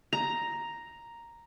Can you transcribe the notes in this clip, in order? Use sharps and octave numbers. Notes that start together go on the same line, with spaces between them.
A#5